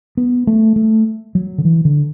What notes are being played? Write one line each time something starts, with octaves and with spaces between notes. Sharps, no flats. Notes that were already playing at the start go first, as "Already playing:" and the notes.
B3
A3
A3
F#3
D3
E3
D3